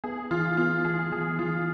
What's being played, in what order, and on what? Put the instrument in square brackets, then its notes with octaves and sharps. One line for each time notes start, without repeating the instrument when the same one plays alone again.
[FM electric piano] B3 [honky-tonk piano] G#4
[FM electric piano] E3 [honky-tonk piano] F4
[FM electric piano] B3 [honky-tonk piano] F4
[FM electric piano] E3 [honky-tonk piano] G#4
[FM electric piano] E3 [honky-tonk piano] G#4
[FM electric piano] E3 [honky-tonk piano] F4